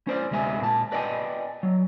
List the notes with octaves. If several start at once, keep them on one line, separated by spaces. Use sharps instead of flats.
C#4 C5 D5
D2 C3 G#3 E5 G#5
A#2 A5
B4 D5 D#5 G5 G#5
F#3